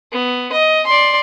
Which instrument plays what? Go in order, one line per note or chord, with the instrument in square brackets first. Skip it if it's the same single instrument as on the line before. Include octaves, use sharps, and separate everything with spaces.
[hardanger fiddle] B3
D#5
D5 C6